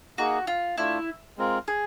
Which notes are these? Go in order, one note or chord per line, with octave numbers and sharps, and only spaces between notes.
A#3 D#4 F#4 G#4
F4
A3 D4 E4 F4
G#3 C4 F4 A#4
G#4